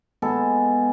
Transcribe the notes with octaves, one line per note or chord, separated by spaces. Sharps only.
G#3 B3 G#4 A4